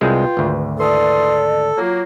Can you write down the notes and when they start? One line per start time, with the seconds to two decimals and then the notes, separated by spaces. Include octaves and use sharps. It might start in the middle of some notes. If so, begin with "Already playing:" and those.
0.01 C2 G#3 F4 G#4 B4 G5
0.37 G#1 D2
0.79 E3 A4 D5 C6 D#6
1.78 F#3 A#3 F4